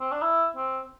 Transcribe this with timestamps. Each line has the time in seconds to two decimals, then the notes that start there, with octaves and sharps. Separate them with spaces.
0.01 C4
0.12 D4
0.22 E4
0.56 C4